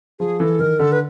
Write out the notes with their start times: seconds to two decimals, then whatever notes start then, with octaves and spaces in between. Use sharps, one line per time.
0.20 F3 G#4
0.39 E3 A4
0.59 D#3 A#4
0.79 D3 A4
0.92 B4